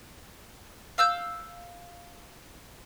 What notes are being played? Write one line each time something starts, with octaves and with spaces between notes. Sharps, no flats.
F5 E6 G6